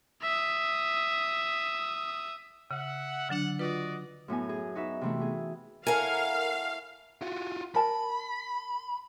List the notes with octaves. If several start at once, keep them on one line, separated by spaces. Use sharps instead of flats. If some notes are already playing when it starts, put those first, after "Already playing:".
E5 D#6
C#3 E5 F#5
D3 F#3 D4 F#5
F4 F#4 B4 D5 D#5
F#2 A2 B3 G#5
G#4
D#4 F#4 B4 E5
C3 E3 A3
B3 G#4
E4 A4 A#4 C#5 F5 F#5 G#5
F4 F#4
A#4 A5 B5